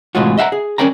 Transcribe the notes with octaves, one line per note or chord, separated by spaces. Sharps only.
C2 A2 E3 G#3 F4 F#4
D#5 E5 F#5 G5 A#5
G#4
C#4 A#4 D5 G5 A#5